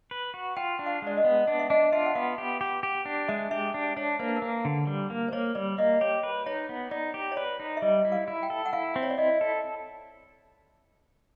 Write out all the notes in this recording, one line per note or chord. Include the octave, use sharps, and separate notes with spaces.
B4
F#4
F4 G5
D4
F5
G#3 D5
D#5
B3
D4 D5
E5
D4 D#5
F4 E5
F#5
B3 F5
G4
G4
G4
D4
G#3 E5
G4 E5
D4
D4 C#5
A#3 C5
B4
A#4
A#3 B4
D3
G3
A#3
C5
A#3 C#5
G3 D5
A#3 D#5
G4 C#5
B4
D#4 C#5
B3
D#4 D5
G4
C#5
B4 D5
D#4
E5
G3 D#5
E4
F5
E4
G5
A4
F#5
E4 F5
C4
C#5
D5
E4 D#5
A4